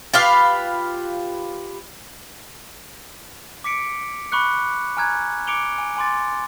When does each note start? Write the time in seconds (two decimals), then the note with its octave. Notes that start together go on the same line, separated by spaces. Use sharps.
0.13 F4 G4 B4 F5
3.64 D6 B6 C#7 D7
4.32 B5 C#6 D6 F#6 C#7
4.97 G#5 A#5 F6 F#6 G#6
5.47 D6 C#7 D7 F7 G7
5.78 G#5
5.97 G#5 C6 D6 A6